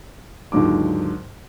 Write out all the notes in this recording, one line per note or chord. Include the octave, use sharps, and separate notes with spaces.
D#2 G#2 D3 F#3 F4 D6